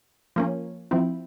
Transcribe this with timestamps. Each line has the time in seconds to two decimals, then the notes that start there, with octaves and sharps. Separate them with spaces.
0.36 F3 A#3 C#4
0.91 F3 C4 E4